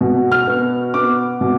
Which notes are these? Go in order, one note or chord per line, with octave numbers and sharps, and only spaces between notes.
B2
F6
B3
B3 D6
B2